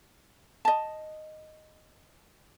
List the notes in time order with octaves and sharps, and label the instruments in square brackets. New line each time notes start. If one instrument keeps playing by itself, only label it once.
[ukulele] D#5 A5